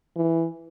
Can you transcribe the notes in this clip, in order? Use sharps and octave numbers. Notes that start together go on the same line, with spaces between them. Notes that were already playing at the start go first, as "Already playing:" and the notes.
E3